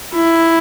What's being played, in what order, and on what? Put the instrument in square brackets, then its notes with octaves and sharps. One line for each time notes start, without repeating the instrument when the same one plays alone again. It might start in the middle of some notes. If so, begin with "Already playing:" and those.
[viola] E4